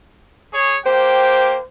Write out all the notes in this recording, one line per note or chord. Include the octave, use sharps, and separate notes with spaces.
G#4 C#5
A#3 G4 C5 G5